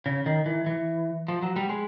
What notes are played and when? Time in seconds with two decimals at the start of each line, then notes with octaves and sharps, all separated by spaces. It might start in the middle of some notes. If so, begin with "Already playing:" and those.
0.06 C#3
0.26 D#3
0.46 E3
0.66 E3
1.28 F3
1.42 F#3
1.56 G3
1.69 G#3